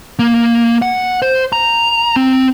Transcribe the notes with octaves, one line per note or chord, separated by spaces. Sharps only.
A#3
F#5
C5
A#5
C4